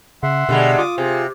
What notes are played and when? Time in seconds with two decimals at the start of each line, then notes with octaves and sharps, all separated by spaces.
0.23 C#3 E5 F#5 C6
0.49 B2 D3 G3 G#3
0.78 F4 D6 D#6
0.98 C3 G#4